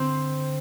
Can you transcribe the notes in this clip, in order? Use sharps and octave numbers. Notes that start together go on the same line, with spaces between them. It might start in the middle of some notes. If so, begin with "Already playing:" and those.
Already playing: D3 C4 C5